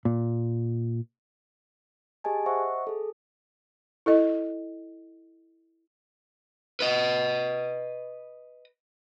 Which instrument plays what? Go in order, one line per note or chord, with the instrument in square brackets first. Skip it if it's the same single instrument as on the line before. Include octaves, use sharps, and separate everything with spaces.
[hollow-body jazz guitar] A#2
[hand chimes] G4 G#4 D#5 G#5 A5
C5 D#5 E5 F#5 C#6
G#4 A4
[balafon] E4 A4 D#5
[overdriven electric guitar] B4 D#5